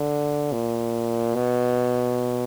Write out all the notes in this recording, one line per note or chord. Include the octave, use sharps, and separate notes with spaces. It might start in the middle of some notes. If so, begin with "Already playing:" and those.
Already playing: D3
A#2
B2